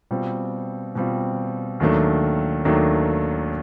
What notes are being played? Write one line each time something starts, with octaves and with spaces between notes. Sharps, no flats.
B2 G3 C4 F4
B2 G3 C4 F4
D#2 D#3 F#3 A3 D4
D#2 D#3 F#3 A3 D4